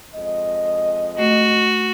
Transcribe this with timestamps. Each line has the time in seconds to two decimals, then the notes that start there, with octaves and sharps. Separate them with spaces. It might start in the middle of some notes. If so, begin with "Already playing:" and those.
0.14 F2 G#3 D#5
1.19 A3 F#4